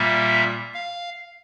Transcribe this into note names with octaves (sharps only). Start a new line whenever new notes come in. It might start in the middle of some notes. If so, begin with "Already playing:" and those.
Already playing: A#2 G3 A#3 E5
F5